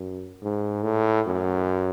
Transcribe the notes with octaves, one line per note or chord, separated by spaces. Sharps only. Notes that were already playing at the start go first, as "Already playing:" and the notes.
Already playing: F#2
G#2
A2
F#2